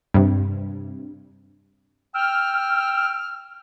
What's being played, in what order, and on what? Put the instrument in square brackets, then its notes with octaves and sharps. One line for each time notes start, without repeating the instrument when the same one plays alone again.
[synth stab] G2 C3
[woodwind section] G5 E6 F6